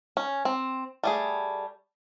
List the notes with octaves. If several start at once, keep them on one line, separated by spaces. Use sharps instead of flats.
C#4
C4
G3 A3 G#4